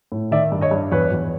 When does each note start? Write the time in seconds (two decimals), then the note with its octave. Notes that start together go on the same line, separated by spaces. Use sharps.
0.12 A2
0.31 D#3 D5 E5
0.52 G2
0.61 C#5 D#5
0.71 G2
0.92 E2 B4 C#5
1.12 E2